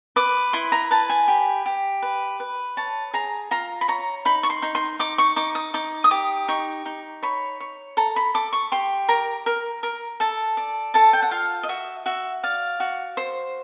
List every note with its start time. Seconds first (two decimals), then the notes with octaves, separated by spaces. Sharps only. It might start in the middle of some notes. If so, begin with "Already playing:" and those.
0.16 B4 D6
0.53 E4 C6
0.72 A#5
0.91 B4 A5
1.09 G#5
1.28 G4
1.66 G4
2.02 B4
2.40 B4
2.77 C#5 A5
3.13 G#4 A#5
3.51 F4 A#5
3.81 B5
3.88 C#5 A#5
4.25 D#4 B5
4.43 C#6
4.50 C6
4.62 D#4
4.75 C6
4.99 D#4 D6
5.18 C#6
5.36 D#4 D6
5.55 D#6
5.74 D#4 D6
6.04 D#6
6.11 G4 D6
6.48 D#4 C#6
6.86 D#4
7.23 C#5 B5
7.60 C#5
7.97 A4 A#5
8.16 B5
8.34 A4 D6
8.53 C#6
8.72 G4 C6
9.09 A#4 A#5
9.46 A#4
9.83 A#4
10.20 A4 A5
10.57 D5
10.94 A4 A5
11.13 G5
11.22 F#5
11.31 F4 F5
11.63 D#5
11.69 F#4 E5
12.06 F#4 E5
12.43 D5 F5
12.80 F#4
13.17 C5